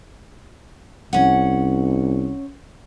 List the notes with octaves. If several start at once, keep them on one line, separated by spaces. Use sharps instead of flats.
C2 C#4 F#5